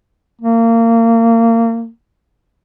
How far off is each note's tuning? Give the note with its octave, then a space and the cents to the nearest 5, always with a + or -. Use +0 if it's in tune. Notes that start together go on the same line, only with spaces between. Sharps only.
A#3 -25